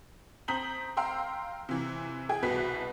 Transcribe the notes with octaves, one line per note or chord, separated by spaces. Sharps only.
C4 A#5 D#6 G6 B6 F#7
F5 G5 A#5 C6 E6
C3 E3
G#4 G5
C2 B2 F#4 B4 B6